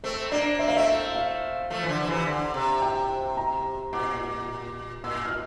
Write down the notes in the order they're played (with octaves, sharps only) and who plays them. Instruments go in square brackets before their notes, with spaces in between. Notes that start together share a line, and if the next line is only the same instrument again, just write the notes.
[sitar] A3 C4 [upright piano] C5
[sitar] A#3 D4 [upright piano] D5
[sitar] C4 [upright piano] E5
[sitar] A#3 [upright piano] F5
[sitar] A3 C4 [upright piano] E5
[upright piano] F5
[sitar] F3 A3
E3
D3 F3
F3
C3 E3
D3
C3
[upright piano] G5
A#5
[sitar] A#2 [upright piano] D6
[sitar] A#2 [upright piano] E6
[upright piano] F6
E6